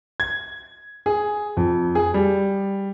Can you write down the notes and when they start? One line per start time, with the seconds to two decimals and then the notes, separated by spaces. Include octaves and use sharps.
0.20 G#6
1.06 G#4
1.57 F2
1.95 G#4
2.14 G3